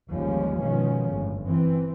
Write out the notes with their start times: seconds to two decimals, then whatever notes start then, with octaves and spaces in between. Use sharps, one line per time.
0.10 G1 D#2 F3 G3 G#3 C#4
0.61 B2 D#3 F3 G#3 C#4
1.09 G1 A2
1.44 F#2 E3 C4